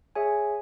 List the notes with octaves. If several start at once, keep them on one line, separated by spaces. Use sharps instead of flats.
G#4 C#5 E5 G#5